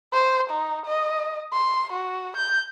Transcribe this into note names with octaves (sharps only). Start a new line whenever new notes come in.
C5
D#4
D#5
C6
F#4
G6